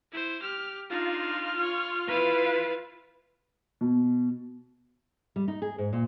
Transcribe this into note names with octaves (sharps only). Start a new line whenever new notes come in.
E4 C5
G4 F6
D4 D#4 F4 F6
C#5
E4 B4 F5
B2
G3
D#4
G#4
G#2
A#2